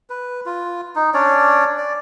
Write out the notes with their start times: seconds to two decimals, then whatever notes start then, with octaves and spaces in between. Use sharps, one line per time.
0.10 B4
0.46 F4
0.95 D#4
1.14 C#4 D4 C#5 D5
1.78 D5